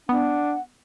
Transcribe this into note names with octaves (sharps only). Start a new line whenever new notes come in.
B3 D4 F#5